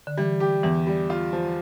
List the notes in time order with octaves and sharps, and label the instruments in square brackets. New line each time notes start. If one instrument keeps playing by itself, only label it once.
[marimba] D3
[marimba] E3 [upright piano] G3
[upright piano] G4
[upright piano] E2 [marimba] E3
[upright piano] G3
F4
F3